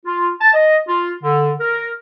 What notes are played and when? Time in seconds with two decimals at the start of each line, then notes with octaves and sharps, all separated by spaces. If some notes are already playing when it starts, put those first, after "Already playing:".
0.06 F4
0.41 A5
0.54 D#5
0.88 F4
1.23 D3
1.60 A#4